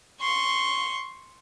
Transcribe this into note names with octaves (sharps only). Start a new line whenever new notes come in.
C6 C#6